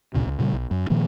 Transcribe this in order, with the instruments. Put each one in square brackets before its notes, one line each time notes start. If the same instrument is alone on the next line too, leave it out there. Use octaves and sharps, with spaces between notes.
[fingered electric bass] D2 A#2 C#3
C#2
A#2 C#3 F#3 G3
B1
F#2
A#2 D#3 F3 A#3